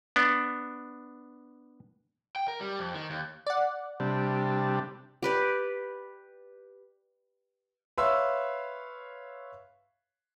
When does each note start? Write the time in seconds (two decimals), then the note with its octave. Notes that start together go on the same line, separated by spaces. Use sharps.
0.16 B3 D4
2.36 G5
2.48 A#4
2.60 G3
2.79 F2
2.94 D#3
3.10 D#2
3.47 D5 F#5
4.00 C3 G3 D4
5.23 G4 B4 D5
7.98 B4 C#5 E5 F5 C6 E6